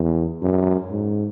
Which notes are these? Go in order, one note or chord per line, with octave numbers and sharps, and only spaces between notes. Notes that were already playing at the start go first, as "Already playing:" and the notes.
Already playing: E2
F#2
G#2